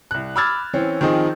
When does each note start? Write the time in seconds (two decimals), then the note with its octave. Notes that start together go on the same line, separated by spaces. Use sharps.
0.11 C2 F#6
0.36 B5 D6 E6 F6 G#6 A6
0.73 E3 C4 C#4
1.01 D#3 F3 C4 D#4 G#4